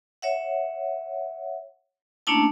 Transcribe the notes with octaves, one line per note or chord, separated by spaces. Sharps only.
C#5 E5 F#5
A3 A#3 C#4 D4 E4 A5